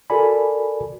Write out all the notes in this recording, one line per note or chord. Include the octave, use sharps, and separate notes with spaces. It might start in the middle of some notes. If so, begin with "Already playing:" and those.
F#4 A4 A#4 D5 G#5 B5